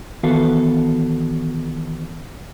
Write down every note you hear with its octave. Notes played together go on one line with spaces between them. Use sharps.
D#3 E3 B3 F#4 A4 F5